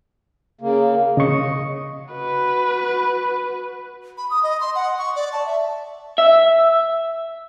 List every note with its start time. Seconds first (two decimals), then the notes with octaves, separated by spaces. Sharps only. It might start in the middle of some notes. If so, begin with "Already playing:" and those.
0.61 C#3 A#3
1.17 C#3 D#5 C#6
2.11 F#4 B4
4.17 B5
4.30 D#6
4.43 D#5
4.60 C6
4.75 F#5
4.98 C#6
5.15 D5
5.33 A5
5.46 E5
6.18 E5